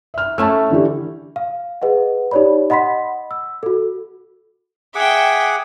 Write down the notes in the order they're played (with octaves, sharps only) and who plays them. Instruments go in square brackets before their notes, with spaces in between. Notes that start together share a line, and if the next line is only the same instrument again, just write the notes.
[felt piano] E5 F6
[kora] A3 C#4 E4 [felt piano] A5 E6
[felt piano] D3 E3 G4
[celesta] F5
G#4 B4 D#5 F#5
D#4 G4 C#5 D5 B5
D#5 F#5 B5 C6 B6
E6
F#4 A4
[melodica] G#4 F#5 D6 [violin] E5 G5